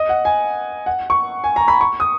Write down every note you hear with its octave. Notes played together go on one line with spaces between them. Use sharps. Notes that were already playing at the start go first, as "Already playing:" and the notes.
Already playing: D#5
F#5
G#5
F#5
C#6
G#5
A#5
B5
C#6
D#6